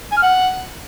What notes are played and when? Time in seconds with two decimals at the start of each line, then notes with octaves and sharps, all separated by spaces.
0.11 G#5
0.17 F6
0.22 F#5